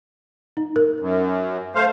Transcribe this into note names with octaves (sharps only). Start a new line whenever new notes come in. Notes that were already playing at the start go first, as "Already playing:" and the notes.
D#4
A#4
F#2
A3 C5 F5